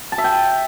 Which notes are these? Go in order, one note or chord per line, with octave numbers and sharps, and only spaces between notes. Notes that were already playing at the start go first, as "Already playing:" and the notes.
A5
E5
G5